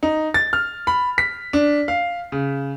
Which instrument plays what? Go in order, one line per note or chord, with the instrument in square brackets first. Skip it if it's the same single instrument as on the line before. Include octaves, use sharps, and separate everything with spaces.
[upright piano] D#4
A6
F6
B5
B6
D4
F5
C#3